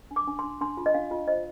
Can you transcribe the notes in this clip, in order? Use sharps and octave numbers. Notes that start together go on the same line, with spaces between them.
D4
D6
D4
C6
D4
D4 C6
F4
D#5
D4 F5
F4
C5 D#5